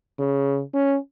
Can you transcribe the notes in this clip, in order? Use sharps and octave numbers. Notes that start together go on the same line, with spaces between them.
C#3
C#4